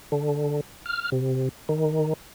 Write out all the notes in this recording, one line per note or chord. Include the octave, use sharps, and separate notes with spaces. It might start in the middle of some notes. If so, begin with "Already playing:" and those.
D3
F6
C3
D#3